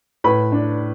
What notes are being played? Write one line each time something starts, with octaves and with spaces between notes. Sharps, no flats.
A2 B4 B5
D4